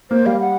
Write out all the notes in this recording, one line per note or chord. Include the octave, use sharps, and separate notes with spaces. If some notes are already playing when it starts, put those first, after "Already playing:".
A#3 C5
G3 F5
F#5